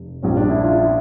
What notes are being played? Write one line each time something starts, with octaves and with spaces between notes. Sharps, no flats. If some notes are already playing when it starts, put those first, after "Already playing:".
Already playing: F1
A#1 A#2 G3 C#4
D4
E4
F4
E4